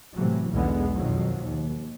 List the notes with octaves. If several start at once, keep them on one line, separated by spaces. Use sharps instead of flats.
A2 C3 E3 F#3
B1 E2 D3 G#3 B3
F2 B2 D#3 F3 F#3
D#2